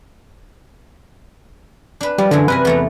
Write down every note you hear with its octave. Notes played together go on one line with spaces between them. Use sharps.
D4 B4
F3 G3
F#2 D3 E3 G#3
C3 A#4 B4 G#5
E2 A3 A#5